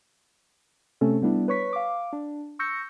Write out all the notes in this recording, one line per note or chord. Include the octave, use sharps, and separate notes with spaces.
C3 A3 C4 C#4 A4
G3 B3 D4 E4
B4 C#5 C#6 B6
F5 D6
D4
C#6 E6 G6 A#6 C#7